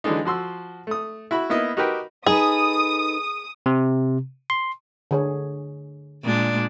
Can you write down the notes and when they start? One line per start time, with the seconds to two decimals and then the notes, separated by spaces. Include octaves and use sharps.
0.04 D3 E3 F#3 G#3 D4 D#4
0.25 F3 F#4 C6 E6
0.87 A3 D#6
1.31 E4 F#4 B5
1.50 A#3 B3 D#4 E4 D#5
1.77 D#4 F#4 G4 A#4 B4 G5
2.26 D#4 G#4 A4 B4 D#6
3.66 C3
4.50 C6
5.11 D3 G#4 C#5
6.23 A#2 G#3 D4